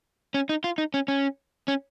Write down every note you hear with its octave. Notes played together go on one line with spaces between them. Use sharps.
C#4
D#4
F4
D#4
C#4
C#4
C#4